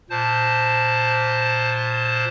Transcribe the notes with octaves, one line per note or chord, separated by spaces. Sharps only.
A#2 C5 A5